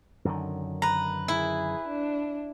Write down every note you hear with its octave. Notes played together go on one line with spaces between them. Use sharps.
F#2 D3 D#3
B4 A#5
E4 G#4
D4